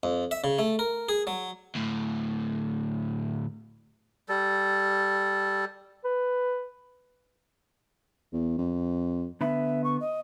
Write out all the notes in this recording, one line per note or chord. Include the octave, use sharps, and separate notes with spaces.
F2
E5
C#3
A3
A#4
G#4
F#3
D2 A2
G3 A4
B4
E2
F2
D3 B3 E5 B5
C#6
D#5